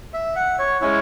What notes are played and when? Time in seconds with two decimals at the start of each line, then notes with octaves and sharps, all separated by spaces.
0.13 E5
0.36 F#5
0.59 C#5
0.81 G#3 C#4 E4 C#5